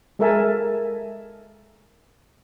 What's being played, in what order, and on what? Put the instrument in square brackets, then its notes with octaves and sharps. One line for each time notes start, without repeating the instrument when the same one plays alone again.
[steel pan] G#3 A4 A#4 E5 G#5 A5